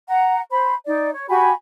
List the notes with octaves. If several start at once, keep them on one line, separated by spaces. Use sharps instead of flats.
F#5 A#5
C5 B5
D#4 D5
C#5
F#4 G4 G#5 B5